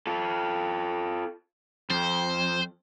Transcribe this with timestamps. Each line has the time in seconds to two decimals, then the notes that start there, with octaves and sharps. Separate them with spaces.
0.07 F4 A4
1.90 F2 C5